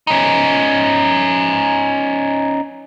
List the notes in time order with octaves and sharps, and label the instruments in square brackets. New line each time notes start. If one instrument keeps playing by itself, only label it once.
[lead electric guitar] C#4 D#4